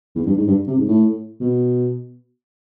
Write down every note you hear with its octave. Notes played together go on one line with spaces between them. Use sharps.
E2
G2
G#2
G2
C3
G#2
A2
B2